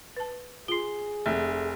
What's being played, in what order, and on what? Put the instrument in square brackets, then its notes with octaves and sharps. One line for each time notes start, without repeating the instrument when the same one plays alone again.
[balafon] B4 A5
[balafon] F4 C6 [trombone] G#4 [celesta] C7 G7
[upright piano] F1 [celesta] E5